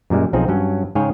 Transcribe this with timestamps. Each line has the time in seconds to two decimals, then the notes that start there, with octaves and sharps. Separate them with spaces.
0.10 F#2 A#2 G3 G#3
0.33 B1 F3 C4 D#4 G#4
0.48 G2 F#3 C#4
0.95 G#2 C#3 G#4 C#5 F5 G5